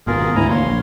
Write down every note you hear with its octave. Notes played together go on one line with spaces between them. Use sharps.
G#1 B2 F4 G#4 A#4
D2 G#2 E3 E4 G#5 A#5
D2 A#3 C#5 F5 C6
A#1